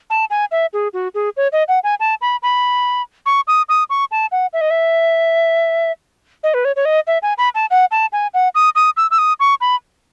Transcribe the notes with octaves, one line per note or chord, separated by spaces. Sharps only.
A5
G#5
E5
G#4
F#4
G#4
C#5
D#5
F#5
G#5
A5
B5
B5
C#6
D#6
D#6
C#6
A5
F#5
E5
D#5
E5
D#5
B4
C#5
C#5
D#5
E5
G#5
B5
A5
F#5
A5
G#5
F#5
D#6
D#6
E6
E6
D#6
C#6
B5